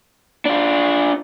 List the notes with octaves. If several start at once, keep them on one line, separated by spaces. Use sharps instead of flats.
D4 F4